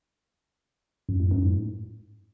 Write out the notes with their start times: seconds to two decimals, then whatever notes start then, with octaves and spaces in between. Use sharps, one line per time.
1.09 F#2
1.20 A2
1.31 F#2
1.43 G#2
1.54 A2